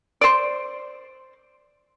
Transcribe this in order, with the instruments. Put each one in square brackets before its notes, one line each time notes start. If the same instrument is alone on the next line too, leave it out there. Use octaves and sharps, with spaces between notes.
[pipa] C5 D5